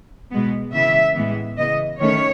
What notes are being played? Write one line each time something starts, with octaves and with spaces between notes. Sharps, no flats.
B2 G#3 B3
C#3 E3 B3 E5
A2 E3 G#3 B3
C#3 E3 B3 D#5
D#3 A3 C#4 C#5